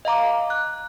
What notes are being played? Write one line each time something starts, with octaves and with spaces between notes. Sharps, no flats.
D#5 F5 A#5 D6
F#6